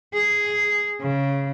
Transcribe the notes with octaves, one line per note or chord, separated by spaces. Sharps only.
G#4
C#3